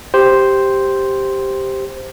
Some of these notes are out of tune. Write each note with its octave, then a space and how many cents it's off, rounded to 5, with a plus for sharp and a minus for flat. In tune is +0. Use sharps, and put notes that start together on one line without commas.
G4 +0 C5 +0